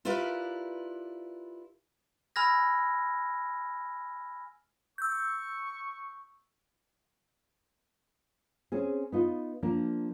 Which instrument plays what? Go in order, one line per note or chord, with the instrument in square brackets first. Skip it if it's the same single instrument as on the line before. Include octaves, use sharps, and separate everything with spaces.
[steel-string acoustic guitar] E4 F4 G4 A#4 B4 D5
[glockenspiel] G#5 B5 E6 F6 G#6 A#6
[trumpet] C#6 [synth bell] E6 G6
[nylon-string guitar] C4 C#4 G#4
B3 D#4 F4
F3 A#3 D4